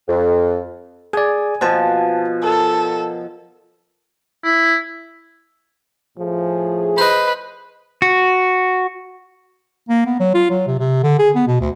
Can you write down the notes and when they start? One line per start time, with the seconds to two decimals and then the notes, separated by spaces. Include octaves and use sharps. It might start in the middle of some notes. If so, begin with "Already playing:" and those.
0.08 F2
1.13 G#4 D5 G#5
1.61 B2 F3 C5 A5
2.43 A4 A#4
4.44 E4
6.18 A2 F3 A3 G#4
6.98 B4 C5 D#5
8.02 F#4
9.89 A#3
10.06 B3
10.20 F#3
10.34 F4
10.50 F#3
10.67 C3
10.79 C3
11.03 D3
11.19 G#4
11.35 B3
11.47 B2
11.60 D2